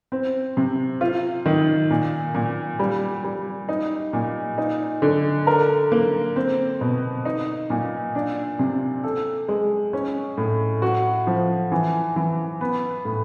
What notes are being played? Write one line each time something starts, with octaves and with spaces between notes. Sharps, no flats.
C4
C3
F4
D#3
A#2
A#2
G3
G3
D#4
A#2
D#4
D3
A#4
A#3
C4
B2
D#4
A#2
D4
C3
A4
G#3
C#4
A2
F#4
F3
E3
E3
B3
A2